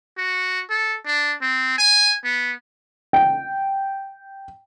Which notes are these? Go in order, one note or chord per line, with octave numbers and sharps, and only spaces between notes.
F#4
A4
D4
C4
G#5
B3
G5